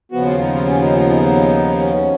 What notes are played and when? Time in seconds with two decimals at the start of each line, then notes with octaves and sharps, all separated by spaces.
0.12 D#2 C#3 F3 B3 F#4
0.26 F4
0.39 D#4
0.53 F4
0.68 C#4
0.82 D#4
0.96 F4
1.09 D#4
1.79 C#4